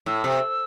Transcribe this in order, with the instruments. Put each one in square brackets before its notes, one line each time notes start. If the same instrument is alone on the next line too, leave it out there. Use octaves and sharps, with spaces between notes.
[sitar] A2 [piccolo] E6
[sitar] C3